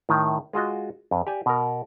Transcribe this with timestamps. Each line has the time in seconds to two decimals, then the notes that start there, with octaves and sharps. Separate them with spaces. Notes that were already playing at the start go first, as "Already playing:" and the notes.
0.09 A2 D#3
0.53 G#3 F4 F#4 D#5
1.11 F2
1.27 G4 D5 G#5
1.46 B2 A#4